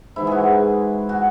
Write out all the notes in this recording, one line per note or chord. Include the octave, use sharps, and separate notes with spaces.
G#2 E3 G#3 E4
F#4 G#4
F#4